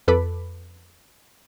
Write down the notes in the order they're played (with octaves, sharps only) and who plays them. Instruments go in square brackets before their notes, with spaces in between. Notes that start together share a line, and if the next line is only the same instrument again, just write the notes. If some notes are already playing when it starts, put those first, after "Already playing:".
[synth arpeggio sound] F2 A4 B4 B5 D6